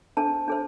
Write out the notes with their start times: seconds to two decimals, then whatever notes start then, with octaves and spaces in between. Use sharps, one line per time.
0.17 D4 A4 C5 A5
0.48 D4 A4 C5